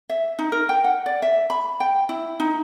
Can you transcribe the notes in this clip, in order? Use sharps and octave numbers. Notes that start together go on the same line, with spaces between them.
E5
D#4
A#4
G5
F#5
D5
E5
B5
G5
E4
D#4